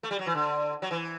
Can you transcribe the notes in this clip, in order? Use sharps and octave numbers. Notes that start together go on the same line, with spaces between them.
A3
G3
F#3
E3
D3
F#3
E3